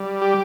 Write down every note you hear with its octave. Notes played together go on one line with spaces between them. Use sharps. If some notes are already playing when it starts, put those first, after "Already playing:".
Already playing: G3
G4